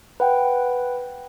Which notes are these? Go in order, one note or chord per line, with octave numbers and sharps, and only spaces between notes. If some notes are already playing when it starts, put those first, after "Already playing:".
B4 F#5 G5